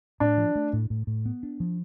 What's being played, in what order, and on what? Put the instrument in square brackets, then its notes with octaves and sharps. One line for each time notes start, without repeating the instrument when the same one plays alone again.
[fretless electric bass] A2 [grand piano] D4
[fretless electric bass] F3
A3
A2
A2
A2
B3
D4
F3